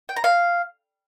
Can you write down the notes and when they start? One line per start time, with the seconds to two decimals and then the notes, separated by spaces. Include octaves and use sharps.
0.09 G5
0.16 A#5
0.24 F5